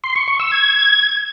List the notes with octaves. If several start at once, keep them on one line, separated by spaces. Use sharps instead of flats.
C6
C#6
C#6
E6
G#6